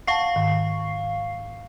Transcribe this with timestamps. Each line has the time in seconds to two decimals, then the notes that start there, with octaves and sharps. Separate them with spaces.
0.07 F5 F#5 A5 C#6 C7
0.36 G#2 D#3